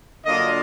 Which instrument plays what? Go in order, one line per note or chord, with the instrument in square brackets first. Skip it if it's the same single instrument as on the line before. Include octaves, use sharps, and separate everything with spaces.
[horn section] D3 F#3 A#3 D4 F4 D#5